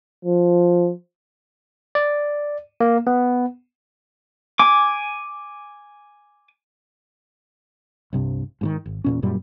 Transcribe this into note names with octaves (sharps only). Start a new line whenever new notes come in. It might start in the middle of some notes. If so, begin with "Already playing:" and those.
F3
D5
A#3
B3
G#5 D6
C2 G2 C3
G#2 C3 D#3
G#1
E2 A#2 C#4
F#2 A#2 G3